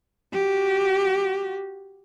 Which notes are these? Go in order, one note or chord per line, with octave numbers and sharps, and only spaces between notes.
F#4 G4